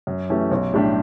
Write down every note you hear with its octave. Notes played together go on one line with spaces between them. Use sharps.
F#2
E3 A3 C#4 G4
B1
A2 G3 D4 G4